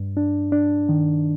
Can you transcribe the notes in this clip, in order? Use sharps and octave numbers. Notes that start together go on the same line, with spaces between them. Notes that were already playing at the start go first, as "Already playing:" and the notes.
Already playing: G2
D4
D4
D#3